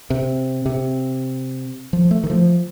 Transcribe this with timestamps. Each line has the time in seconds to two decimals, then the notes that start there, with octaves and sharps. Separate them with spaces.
0.10 C3
0.66 C3
1.93 F3
2.11 A3
2.24 D#3
2.30 F3